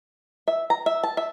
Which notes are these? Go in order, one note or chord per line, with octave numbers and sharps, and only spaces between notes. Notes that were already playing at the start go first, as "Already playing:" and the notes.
E5
A#5
E5
A5
E5